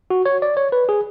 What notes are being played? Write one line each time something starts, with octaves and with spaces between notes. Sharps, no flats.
F#4
C#5
D5
C#5
B4
G#4